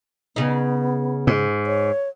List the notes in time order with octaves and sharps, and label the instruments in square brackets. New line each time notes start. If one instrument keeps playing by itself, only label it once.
[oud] C#3 D#4 [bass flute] B3
[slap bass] G#2
[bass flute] C#5